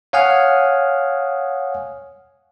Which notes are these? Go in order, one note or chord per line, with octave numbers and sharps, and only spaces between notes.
C#5 F5 F#5 G#5 D#6 F6